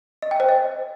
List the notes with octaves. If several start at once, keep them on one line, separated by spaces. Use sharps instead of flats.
D#5
G5
C5
D#5